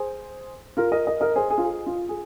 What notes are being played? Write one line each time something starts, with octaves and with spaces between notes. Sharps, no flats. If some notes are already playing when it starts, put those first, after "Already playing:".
Already playing: G#4 C5
F4 A#4
A#4 D#5
A#4 D#5
A#4 D#5
G#4 C5
G#4
F4
G#4
F4
G#4